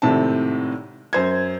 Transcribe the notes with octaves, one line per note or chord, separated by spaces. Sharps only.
G#1 A2 C3 C4 A5
F#2 C5 G#6